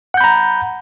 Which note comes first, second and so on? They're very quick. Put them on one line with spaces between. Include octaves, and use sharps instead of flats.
F#5 G6 B5 A#5